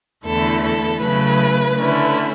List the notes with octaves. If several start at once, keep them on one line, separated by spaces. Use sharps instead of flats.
E2 D3 A3 E4 A4
A4
C#3 F#3 A3 E4 B4
D3 A3 C#4 E4